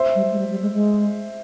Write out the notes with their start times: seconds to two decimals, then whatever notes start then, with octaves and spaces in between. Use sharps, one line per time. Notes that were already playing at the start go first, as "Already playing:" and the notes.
Already playing: C5 E5
0.15 G3
0.31 G#3
0.39 G3
0.51 G3
0.62 G#3
0.74 G#3